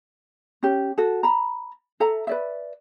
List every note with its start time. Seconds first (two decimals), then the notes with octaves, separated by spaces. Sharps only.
0.63 C#4 G4
0.98 F#4 A4
1.23 A#5 B5
2.00 A4 E5 A#5
2.27 B4 D5 E5